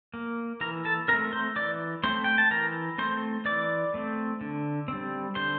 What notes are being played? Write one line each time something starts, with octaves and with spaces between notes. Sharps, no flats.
A#3
E3 A#4 A#5
A4 A5
A3 C4 A#4 A#5
C5 C6
E3 D5 D6
A3 C4 C5 C6
G5
A5
E3 A#4 A#5
A3 C4 C5 C6
E3 D5 D6
A3 C4
D3
G3 C4
D3 C5 C6